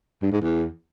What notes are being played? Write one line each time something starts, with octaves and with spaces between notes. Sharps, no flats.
G2
G#2
E2